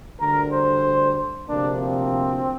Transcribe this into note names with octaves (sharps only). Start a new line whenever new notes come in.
D2 D3 G3 A#4
C5
D2 C3 F3 A#3 D4
C4